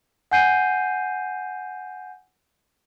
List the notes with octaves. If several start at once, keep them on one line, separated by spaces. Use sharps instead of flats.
F#5 G#5 G6 C7 D#7